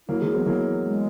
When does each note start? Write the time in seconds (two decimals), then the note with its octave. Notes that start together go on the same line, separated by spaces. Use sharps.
0.08 F#3 A#3 E4
0.21 E3 G#3
0.28 F#3
0.34 G#3 B3
0.46 E3 F#3 A#3
0.85 G#3